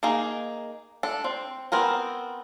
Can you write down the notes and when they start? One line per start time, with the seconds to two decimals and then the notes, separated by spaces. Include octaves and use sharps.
0.03 A#3 D#4 G#4
1.03 D4 A4
1.24 C4
1.72 B3 C4 A#4 G#5